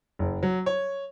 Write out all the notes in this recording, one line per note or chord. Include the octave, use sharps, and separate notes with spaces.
F#1
F#3
C#5